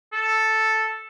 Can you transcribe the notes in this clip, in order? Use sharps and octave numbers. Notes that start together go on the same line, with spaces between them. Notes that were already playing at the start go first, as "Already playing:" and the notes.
A4